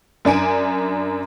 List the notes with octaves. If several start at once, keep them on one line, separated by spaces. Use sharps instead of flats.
F#2 D4 G#5 D7